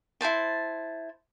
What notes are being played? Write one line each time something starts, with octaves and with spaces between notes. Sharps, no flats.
E4 G#4 C5 A5